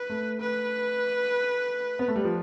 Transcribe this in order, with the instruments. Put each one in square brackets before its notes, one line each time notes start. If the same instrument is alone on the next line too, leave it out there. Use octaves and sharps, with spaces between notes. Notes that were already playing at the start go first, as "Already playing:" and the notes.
Already playing: [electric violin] B4
[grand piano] A3
[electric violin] B4
[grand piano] B3
A3
G3
F3